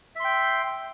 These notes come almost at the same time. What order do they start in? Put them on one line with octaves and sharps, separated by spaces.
E5 C6 G5